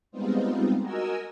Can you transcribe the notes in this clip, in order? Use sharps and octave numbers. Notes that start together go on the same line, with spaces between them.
G3 G#3 B3 C4 D#4 F4
F#4 A#4 D#5 G#5 E6